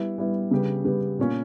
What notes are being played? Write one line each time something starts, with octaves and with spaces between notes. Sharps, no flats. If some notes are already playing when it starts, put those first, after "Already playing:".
Already playing: G3 B3 E4
G3 B3 E4
C#3 G3 B3 G4
C#3 G3 B3 G4
A#2 A#3 C#4